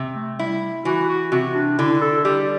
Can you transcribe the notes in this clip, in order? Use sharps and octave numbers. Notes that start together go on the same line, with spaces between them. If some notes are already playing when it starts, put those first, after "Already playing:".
Already playing: C3
A3
G3 E4
E3 F#4
F#4
C3 F#4
D4
D3 E4
A4
G3 G4